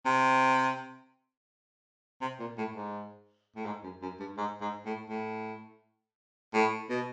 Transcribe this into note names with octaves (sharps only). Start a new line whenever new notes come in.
C3
C3
A#2
A2
G#2
A2
G#2
F#2
F#2
G2
G#2
G#2
A2
A2
A2
B2